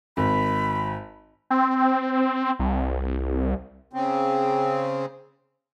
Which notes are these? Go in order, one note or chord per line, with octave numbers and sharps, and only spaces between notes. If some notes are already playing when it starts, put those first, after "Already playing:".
G#1 B5
C4
C2
C#3 C4